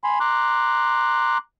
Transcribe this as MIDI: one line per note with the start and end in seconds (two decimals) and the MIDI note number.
0.04 0.19 80
0.04 0.19 83
0.04 0.19 84
0.20 1.38 82
0.20 1.38 84
0.20 1.38 86
0.20 1.38 90